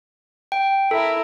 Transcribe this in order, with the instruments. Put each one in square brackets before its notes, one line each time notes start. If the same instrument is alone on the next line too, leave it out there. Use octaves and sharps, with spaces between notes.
[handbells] G5
[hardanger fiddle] E4 A#4 [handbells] A4